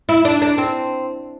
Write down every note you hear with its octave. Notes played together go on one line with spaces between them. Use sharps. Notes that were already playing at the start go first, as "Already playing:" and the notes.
E4
D4
D4
C4